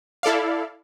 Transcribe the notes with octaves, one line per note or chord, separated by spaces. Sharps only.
E4 A4 D5 F5